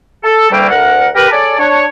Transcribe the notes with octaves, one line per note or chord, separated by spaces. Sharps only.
A4
D2 E3 G3 A3 A#3 G5
D2 A#4 F#5
G4 A#4 B4
G#4 A4 C#5 D5
D4 C#5